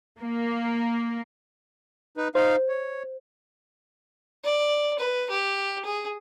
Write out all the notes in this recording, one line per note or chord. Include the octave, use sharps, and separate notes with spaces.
A#3
D#4 B4
D#4 C5 F5
C#5
D5
B4
G4
G#4